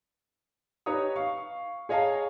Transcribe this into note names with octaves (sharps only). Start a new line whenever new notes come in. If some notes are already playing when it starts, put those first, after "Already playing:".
D#4 G4 B4 C#5 A#5 D#6
F5 C#6
G#4 C#5 D#5 F5 A5 A#5